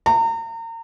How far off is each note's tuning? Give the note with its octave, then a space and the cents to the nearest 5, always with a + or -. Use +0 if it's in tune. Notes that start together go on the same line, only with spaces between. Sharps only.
A#5 -35